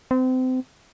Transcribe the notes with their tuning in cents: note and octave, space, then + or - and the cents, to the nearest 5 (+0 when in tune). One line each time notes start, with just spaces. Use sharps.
C4 -30